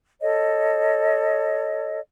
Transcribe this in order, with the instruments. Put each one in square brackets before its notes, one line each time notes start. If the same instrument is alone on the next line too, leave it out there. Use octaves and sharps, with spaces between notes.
[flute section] A4 C#5 D#5